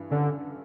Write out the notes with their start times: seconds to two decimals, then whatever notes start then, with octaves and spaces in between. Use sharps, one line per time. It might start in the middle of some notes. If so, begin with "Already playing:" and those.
Already playing: G2 E3
0.10 D3 C#4